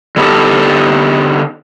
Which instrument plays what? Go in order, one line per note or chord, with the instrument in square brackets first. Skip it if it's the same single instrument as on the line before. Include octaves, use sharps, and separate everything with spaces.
[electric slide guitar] D3 B3 D#4 G4 A4